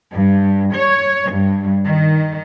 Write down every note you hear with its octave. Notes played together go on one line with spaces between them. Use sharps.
G2
C#5
G2
D#3